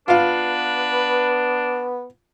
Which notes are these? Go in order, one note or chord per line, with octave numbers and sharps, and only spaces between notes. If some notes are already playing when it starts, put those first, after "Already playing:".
B3 D4 F4 B4 F5